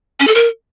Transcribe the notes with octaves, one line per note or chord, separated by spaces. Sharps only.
C#4
A4
A#4